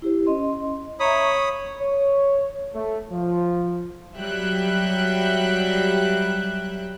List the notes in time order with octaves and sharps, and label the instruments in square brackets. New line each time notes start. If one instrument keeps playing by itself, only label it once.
[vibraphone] E4 G4 C5
C#4 D#5 C6
[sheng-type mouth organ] C#5 B5 D#6 [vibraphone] E5 A#5
[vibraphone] C#6
[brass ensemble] C#5
A3
F3
[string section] F#3 G3 E5 G5 F#6